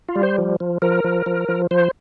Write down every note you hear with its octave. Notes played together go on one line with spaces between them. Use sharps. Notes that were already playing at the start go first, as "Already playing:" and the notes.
F4
G3
C5
F3
F3
F3 A#4
F3
F3
F3
F3 C5